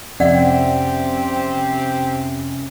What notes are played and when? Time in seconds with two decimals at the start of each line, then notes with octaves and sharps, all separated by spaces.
0.20 F2 C3 C4 C#4 G4 D5 E5 F#5